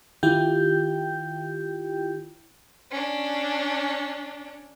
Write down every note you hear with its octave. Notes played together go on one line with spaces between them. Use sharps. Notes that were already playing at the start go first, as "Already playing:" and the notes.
D#3 E4 F4 G4 G5 G6
C#4 D4